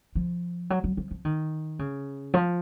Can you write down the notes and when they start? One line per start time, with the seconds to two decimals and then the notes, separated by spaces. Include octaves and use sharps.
0.15 F3
0.70 F#3
0.84 F#3
0.97 F3
1.11 F3
1.25 D#3
1.79 C#3
2.34 F3